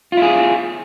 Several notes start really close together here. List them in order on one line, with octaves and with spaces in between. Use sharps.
F4 E4 G#4